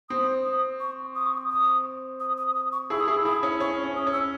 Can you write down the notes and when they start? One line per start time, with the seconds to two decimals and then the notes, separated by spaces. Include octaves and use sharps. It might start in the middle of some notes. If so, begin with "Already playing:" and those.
0.10 C4 D#6
0.45 D#6
0.80 C#6
1.15 D#6
1.26 C#6
1.37 D#6
1.49 D#6
2.20 D#6
2.37 D#6
2.55 D#6
2.72 C#6
2.90 E4 G#4 E6
3.00 D#6
3.08 E4 G#4 E6
3.25 E4 G#4 D#6
3.43 C#4 E4
3.60 C#4 C#6
3.84 C#4
3.96 D#6
4.07 C#4
4.13 E6